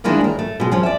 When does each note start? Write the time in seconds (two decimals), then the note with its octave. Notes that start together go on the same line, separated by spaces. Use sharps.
0.04 D#3 E3 G#3 A#3 D4 E4
0.21 D#2 A#4
0.39 A3
0.60 B2 G#3
0.71 F#2 F3 C#4
0.83 D5 E5